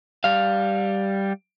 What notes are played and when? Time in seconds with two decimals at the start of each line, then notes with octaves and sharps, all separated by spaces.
0.24 G3 F5